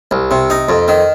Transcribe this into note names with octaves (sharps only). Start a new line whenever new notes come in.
C2
C3
D#4
F2
D#3